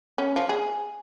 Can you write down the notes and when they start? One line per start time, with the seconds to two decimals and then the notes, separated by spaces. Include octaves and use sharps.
0.18 C#4
0.36 F3
0.49 G#4